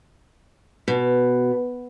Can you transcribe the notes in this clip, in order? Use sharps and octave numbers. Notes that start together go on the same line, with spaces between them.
B2